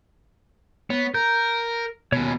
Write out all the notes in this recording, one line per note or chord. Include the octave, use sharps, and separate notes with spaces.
B3 C#5
A#4 G6
D#2 B2 C#5 G#5